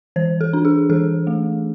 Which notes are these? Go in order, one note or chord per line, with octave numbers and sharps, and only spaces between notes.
E3 C5
A4
D4
G#4
E3 A4
A3